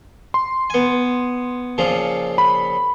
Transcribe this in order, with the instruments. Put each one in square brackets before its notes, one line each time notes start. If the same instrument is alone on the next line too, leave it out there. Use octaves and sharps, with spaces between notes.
[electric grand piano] C6
[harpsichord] B3 G#5
A#2 C#3 F3
[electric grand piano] B5